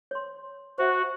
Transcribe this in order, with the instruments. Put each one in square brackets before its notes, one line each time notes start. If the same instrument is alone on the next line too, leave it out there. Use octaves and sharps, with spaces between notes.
[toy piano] C#5 C6
[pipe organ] F#4 [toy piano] C5 E5 F#5